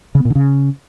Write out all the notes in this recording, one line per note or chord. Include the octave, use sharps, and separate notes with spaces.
C#3
B3
A#2
D3
C#3